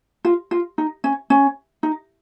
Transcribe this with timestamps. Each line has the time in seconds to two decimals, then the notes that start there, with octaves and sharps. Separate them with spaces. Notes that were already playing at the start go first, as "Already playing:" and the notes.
0.25 F4
0.51 F4
0.78 D#4
1.04 C#4
1.30 C#4
1.83 D#4